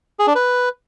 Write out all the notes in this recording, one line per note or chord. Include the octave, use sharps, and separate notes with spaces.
G#4
D4
B4